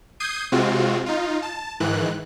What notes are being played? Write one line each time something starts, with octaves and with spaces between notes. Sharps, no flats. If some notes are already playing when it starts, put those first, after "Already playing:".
D#6 G6 G#6 C7 D#7
C3 G#3 C4 F4 F#4
D#4 F4
A5
G#2 D#3 E3 F#6